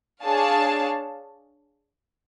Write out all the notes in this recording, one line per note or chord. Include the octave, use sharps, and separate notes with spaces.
D4 G#4 C#5 F5 A5